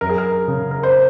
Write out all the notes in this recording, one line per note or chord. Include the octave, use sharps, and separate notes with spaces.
F#2 A#4
G#4
A#4
C#3
A#4
C5